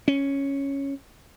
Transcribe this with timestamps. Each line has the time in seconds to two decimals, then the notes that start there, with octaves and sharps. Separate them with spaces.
0.08 C#4